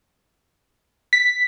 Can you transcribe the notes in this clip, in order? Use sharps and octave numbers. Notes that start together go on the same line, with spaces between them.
B6